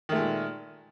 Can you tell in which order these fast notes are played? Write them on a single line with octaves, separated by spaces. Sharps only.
D#3 A3 G#3 A#2